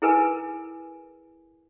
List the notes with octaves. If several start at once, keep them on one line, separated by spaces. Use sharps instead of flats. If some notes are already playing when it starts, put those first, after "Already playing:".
E4 G#4 A#4 B4 G#5